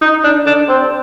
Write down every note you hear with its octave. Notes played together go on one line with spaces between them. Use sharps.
D#4
D4
D4
C4